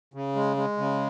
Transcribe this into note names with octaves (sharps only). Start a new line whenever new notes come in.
C#3
G#3
G#3
C#3